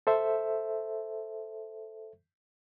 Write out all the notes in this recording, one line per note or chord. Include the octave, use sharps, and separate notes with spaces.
A4 C5 E5